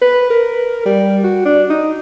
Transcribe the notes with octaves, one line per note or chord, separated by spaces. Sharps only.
B4
A#4
G3
F#4
D4
D#4